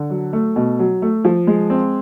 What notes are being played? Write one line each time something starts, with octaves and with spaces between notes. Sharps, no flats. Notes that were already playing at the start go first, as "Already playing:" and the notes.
Already playing: D3
F#3
A3
B2
F#3
A3
F3
G#3
C4